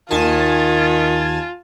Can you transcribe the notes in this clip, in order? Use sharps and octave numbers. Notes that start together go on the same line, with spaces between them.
D#2 D#3 F4 G#5 A5